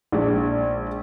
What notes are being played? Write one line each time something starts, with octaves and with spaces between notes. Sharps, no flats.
A#1 G#3 D5